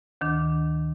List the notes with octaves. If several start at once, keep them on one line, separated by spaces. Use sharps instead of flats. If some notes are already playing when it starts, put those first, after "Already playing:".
D2 D#3 D4